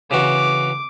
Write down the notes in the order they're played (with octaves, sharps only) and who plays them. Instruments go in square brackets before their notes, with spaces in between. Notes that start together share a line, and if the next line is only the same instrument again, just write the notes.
[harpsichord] C#3 E3 F#4 [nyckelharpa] D6